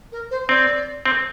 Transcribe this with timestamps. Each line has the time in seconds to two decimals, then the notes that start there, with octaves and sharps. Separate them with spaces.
0.12 A#4
0.31 C5
0.49 C4 D5
1.05 C4